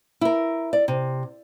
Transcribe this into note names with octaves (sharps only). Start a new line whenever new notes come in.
E4 A#4
D5
C3